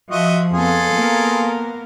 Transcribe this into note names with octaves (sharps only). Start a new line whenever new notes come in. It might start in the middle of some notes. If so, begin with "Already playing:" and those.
F3 F#4 D#5 E5
F2 B3 F4 G#4 A4
A#3 B3 A#4